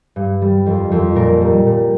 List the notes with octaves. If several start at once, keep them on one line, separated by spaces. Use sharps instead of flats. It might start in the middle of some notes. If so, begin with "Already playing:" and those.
G2
G3
F2
F2
A#2 A#4
G3
A#2